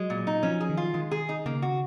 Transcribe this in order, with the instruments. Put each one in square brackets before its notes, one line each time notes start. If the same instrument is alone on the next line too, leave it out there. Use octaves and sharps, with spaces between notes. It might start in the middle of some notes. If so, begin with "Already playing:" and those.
Already playing: [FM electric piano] F#3 [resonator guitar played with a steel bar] G#3
[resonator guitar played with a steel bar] A#2
D#4
[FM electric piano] F3 [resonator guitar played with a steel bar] C#4
[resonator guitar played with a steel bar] G#4
[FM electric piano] D#3
[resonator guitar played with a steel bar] F4
[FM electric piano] D#3 [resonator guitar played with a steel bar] G#3
[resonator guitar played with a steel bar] G#4
D#4
[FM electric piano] C#3 [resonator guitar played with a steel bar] A#3
[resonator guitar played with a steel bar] F#4